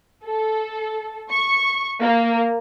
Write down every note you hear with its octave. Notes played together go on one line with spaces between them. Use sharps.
A4
C#6
A#3